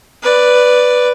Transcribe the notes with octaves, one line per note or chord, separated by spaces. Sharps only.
B4 D5